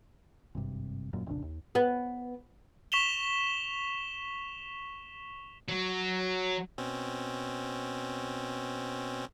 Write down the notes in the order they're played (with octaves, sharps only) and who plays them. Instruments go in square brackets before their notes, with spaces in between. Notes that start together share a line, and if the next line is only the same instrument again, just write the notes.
[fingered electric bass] G#1 G2 C3
E1 F#2 A#2
F1 A#1 C#3 D4
D#2
[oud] B3
[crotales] C#6 B6 E7 F7 G7
[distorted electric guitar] F#3
[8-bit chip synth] B2 C4 C#4